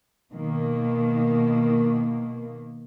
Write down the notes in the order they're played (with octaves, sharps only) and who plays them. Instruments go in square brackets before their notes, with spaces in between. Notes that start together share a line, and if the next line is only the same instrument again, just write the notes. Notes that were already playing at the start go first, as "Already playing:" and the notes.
[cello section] B2 D#3 A#3